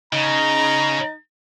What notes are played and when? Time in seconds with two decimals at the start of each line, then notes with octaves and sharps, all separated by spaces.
0.13 C#3 D#4 A#5